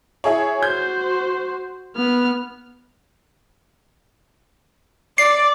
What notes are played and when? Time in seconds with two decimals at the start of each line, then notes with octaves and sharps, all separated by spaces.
0.24 E4 G#4 C#5
0.63 F#4 C5 G6
1.97 B3 F6
5.18 D5 C7